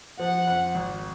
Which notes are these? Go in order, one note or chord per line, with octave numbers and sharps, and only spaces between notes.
F3 F#5
F2
G#1